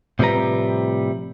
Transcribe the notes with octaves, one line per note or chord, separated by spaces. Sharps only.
A2 C3 F3 G3 B4 A#5